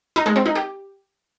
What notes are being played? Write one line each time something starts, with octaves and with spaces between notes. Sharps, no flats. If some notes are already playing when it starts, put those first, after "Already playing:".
D#4
G#3
C4
D#4
G4